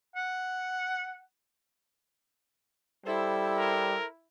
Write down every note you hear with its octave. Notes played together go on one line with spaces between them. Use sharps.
F#5
G3 E4 A4 C5
A#4